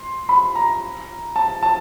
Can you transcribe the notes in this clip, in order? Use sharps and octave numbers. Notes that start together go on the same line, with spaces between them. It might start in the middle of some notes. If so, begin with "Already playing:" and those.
Already playing: C6
B5
A#5
A5
A5